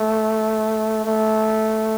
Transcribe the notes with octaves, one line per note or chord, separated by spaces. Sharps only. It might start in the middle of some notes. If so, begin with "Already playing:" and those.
Already playing: A3
A3